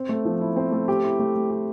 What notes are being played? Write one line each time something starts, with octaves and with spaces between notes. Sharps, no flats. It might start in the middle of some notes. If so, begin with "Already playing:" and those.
Already playing: C4
A3
F3
E4
C4
A3
G4
E4
A3
A3
G4